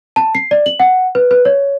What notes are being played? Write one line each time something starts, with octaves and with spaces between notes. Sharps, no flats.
A5
C7
D5
F#7
F#5
B4
B4
C#5